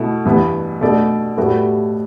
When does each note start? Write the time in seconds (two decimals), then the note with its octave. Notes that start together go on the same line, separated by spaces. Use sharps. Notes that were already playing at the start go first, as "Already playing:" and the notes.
Already playing: B2 A3 E4
0.25 G2 E3 B3
0.81 B2 A3 D4 A4 D5
1.37 A2 G3 B3 F#4 A4